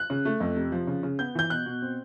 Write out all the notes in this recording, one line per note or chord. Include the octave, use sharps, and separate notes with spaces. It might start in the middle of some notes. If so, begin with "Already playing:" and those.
Already playing: F#6
C#3
A3
F2
C3
F3
C#3
C#3
B3 G6
E3 G6
B2 F#6
B2
C4